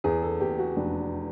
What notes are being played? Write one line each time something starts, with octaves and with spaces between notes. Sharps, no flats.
E2 G#4
A4
E2 G4
F#4
F1 D4